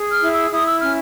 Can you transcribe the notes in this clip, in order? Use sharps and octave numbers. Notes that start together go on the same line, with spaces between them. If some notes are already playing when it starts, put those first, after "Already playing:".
Already playing: G#4
F6
E4
E6
E4 D#6
E6
C#4 F6